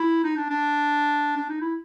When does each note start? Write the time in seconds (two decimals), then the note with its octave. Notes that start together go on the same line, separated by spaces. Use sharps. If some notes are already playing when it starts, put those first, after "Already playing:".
Already playing: E4
0.24 D#4
0.37 D4
0.50 D4
1.36 D4
1.49 D#4
1.61 E4